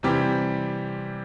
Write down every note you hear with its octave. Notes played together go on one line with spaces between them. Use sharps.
C3 E3 G3 C4 G4